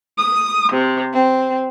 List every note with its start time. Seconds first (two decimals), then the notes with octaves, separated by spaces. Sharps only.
0.18 D#6
0.72 C3
1.12 C4